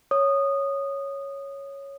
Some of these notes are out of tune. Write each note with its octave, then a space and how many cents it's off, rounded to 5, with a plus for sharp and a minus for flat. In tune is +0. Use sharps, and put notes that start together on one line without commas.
C#5 +0 D#6 -15